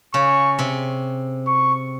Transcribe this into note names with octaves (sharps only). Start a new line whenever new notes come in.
C#3 C#6
C3
C#6